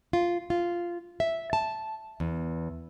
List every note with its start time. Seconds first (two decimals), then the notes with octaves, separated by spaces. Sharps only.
0.13 F4
0.50 F4
1.20 E5
1.53 A5
2.20 E2